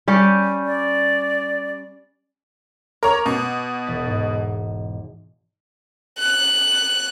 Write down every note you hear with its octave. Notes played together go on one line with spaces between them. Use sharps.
G3 C#4 G4
D5
A#4 C#5 A#5 D6
B2
E1 A6 B6
G#2
F#6